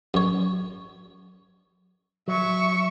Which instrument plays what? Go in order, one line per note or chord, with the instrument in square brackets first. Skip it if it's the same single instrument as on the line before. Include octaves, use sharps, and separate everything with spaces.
[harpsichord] F#2 C#5
[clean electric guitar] F#3 [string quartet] E5 C#6